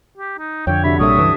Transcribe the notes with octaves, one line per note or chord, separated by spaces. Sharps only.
G4
D#4
F2 D3 C#5 G5
C3 D4 F#4 E5 B5
A#1 A#2 G3 D4 A4 C#5 E5 D#6
C#2 G2 E3